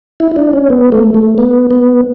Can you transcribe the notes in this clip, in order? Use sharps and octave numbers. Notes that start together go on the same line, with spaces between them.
E4
E4
D4
C#4
B3
A3
A3
B3
B3